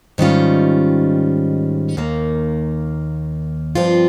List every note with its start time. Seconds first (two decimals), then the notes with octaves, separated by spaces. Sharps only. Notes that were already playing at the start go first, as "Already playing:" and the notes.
0.18 G#2 D#3 G3 C#4 F4
1.97 D#2 D#3 A#3
3.75 G2 F3 C4 F4